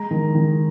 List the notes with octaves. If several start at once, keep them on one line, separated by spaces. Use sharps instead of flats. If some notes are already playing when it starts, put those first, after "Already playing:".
Already playing: G#3 A#5
D#3
D#3